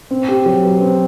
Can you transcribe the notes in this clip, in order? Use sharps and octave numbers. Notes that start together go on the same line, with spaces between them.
C4
G4
F#3
B4
C4